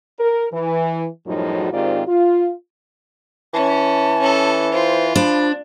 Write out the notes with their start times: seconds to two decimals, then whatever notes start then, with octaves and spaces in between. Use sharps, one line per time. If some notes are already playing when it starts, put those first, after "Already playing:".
0.19 A#4
0.52 E3
1.27 F#2 A2 F3 G3 D#4 F#4
1.73 G#2 D#3 C4 F4 G4 D5
2.07 F4
3.54 E3 C#4 A5
4.20 C#4 A4
4.72 F4 C5
5.16 F3 D4 B5